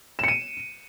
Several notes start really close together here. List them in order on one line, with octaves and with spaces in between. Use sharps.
E7 C#7 D#7